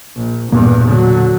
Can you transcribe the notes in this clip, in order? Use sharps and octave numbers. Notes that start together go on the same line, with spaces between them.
A#1
E1 E2 G2 A#2 A#3
D3 F#3